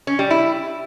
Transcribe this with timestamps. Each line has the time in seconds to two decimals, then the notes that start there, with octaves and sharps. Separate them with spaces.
0.07 C#4
0.19 G3
0.30 E4